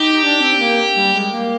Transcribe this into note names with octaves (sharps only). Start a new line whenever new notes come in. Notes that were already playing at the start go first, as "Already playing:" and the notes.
Already playing: D#4 G4
D4
C4
A#3
G3
G#3
A#3